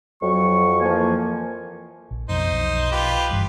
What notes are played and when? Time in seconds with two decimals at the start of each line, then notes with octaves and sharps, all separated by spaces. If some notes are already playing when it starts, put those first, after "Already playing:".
0.22 F2 F#3 C#6
0.80 E3 F3 A#3 G#5
2.11 A#1
2.29 F2 B2 F3 D#4 C5
2.52 B1
2.92 F4 G4 B4
3.29 F#1 G2 E3